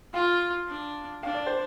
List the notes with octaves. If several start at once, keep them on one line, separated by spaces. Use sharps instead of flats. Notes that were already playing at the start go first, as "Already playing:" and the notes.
F4 F5
D4
D4 F5
D5
C5